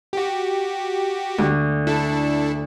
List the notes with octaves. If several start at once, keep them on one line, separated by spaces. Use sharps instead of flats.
F#4 G4
D2
D4 E4 A4